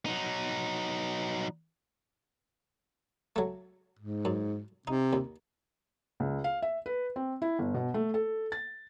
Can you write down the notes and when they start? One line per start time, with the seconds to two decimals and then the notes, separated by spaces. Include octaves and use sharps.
0.06 F#3 D#4
3.36 F#3 A3
3.99 G#2
4.25 F#2
4.87 C3 D#4
5.13 D#2
6.20 C#2
6.44 F5
6.62 E5
6.86 B4
7.16 C4
7.42 E4
7.59 G1
7.74 B2
7.94 A3
8.14 A4
8.52 A6